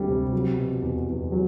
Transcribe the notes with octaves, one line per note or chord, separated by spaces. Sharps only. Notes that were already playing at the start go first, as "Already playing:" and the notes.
Already playing: D2 G3 C4
C3
F#3
B2
E2
E2
F#3